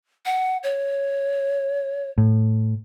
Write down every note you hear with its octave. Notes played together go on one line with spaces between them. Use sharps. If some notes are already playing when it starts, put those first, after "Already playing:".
F#5
C#5
A2